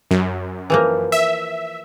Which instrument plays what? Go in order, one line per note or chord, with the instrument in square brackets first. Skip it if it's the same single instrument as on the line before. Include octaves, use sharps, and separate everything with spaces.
[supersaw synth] F#2
[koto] E3 F3 A#3
[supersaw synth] E5